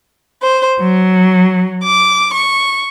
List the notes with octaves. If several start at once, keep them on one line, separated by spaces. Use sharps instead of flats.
C5
F#3
D6
C#6